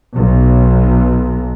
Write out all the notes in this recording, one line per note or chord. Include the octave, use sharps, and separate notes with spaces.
B1